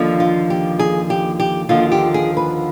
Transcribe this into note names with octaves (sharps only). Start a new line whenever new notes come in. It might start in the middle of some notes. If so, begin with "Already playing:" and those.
Already playing: D#2 D3 F3
F4
G4
G#4
G4
G4
D#2 D3 F3 F4
G4
G#4
B4